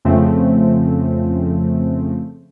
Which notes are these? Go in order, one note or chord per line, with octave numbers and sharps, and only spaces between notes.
F2 C#3 F3 A3 C4